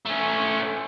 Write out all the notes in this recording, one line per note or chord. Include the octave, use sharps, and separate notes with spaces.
A3 C#4